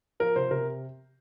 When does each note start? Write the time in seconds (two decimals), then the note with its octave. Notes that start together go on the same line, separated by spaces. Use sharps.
0.20 F3 A#4
0.36 C3 C5
0.51 C3 A#4